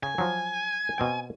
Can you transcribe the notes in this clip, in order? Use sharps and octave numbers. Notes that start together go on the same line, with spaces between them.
C#3 G#5
F3 F#3
B2 C4 G5